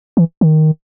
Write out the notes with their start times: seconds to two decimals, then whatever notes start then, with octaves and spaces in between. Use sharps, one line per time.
0.17 E3
0.41 D#3